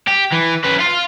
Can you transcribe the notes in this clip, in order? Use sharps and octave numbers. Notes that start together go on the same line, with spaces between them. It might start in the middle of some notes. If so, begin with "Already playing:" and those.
G4
E3
C#4 B4
F5 C6